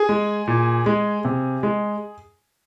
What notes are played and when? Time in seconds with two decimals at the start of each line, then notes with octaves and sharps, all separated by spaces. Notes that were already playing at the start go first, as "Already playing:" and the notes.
Already playing: G#4 G#5
0.09 G#3
0.48 A#2
0.86 G#3
1.25 C3
1.63 G#3